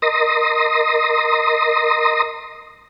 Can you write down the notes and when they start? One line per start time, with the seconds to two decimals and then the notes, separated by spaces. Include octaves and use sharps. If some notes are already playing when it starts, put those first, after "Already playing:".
0.02 A#4 D#5 C6 D#6 A#6